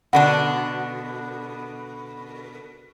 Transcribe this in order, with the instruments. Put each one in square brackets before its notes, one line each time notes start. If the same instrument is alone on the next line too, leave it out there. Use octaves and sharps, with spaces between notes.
[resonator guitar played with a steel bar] B2 D3 D4 [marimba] F#5